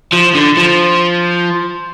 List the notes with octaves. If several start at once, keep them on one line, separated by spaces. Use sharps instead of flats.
F3
D3
F3